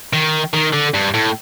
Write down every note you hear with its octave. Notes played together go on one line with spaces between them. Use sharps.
D#3
D#3
D3
G2
A2